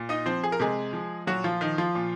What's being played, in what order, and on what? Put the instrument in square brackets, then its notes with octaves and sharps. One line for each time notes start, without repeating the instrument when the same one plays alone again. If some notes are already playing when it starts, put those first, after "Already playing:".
Already playing: [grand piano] A#2
D#4 D#5
F3 C4 C5
G#4
A#4
C3 G#3 G#4
F3
A#2 F#3 F#4
F3 F4
D#3 F3 D#4
F3 F4
A#2